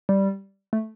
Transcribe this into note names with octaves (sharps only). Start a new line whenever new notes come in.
G3
A3